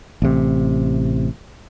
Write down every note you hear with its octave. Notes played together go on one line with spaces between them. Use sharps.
A1 C3